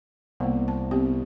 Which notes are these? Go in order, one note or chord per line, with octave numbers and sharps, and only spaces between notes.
C2 A#3 B3
A5
B3 C4 G4